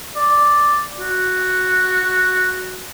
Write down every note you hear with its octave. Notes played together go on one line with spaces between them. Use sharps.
D5
F#4